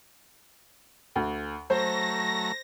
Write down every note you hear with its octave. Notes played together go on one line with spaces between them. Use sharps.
D2
F#3 A3 C5 A#6